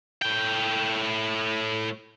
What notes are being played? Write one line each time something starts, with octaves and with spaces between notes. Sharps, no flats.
A2 G5